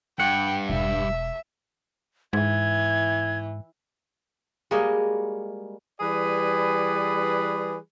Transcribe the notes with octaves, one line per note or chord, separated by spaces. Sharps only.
G2 F#5 G5
E1 E5
G#2 E3 G#6
G3 G#3 A#3 F#4 C#5 D#5
E3 G3 G#4 B4 D5